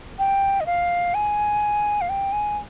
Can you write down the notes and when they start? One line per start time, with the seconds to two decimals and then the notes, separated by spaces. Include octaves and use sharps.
0.19 G5
0.61 D#5
0.66 F5
1.14 G#5
2.01 F5
2.09 G5
2.32 G#5